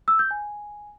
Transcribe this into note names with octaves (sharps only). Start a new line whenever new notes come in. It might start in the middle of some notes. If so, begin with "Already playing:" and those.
E6
G6
G#5